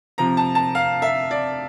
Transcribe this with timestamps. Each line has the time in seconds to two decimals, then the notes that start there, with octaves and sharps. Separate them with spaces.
0.18 C3 F3 A#5
0.37 A5
0.55 A5
0.75 F5
1.02 E5
1.31 D5